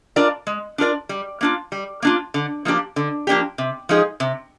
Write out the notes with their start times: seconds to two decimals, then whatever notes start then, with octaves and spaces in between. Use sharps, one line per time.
0.16 D4 F4 A#4 D5
0.47 G#3
0.78 D4 F4 A#4 D5
1.09 G3
1.41 A#3 D4 F4
1.72 G3
2.02 A#3 D4 F4
2.34 D3
2.65 F3 A#3 D4 G4
2.96 D3
3.27 F3 A#3 D4 G4
3.58 C3
3.89 F3 G#3 D#4 G#4
4.20 C3